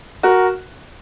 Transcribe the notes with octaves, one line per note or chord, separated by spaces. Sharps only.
F#4 A#4